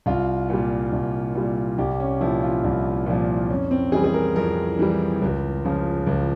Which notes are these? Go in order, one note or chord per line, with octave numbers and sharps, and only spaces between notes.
C2 F4
A#2 G3
C2
A#2 G3
C2 G4
C#4
A#2 F3 E4
F4
C2
A#2 F3
F2 C#4
C4
E3 G3 G#4
G#4
A#4
F2 A#4
E3 G3
C#2
C#3 F3
C#2